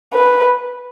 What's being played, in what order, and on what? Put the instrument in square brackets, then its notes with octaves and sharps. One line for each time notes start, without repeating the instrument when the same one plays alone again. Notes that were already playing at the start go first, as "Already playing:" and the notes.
[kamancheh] B4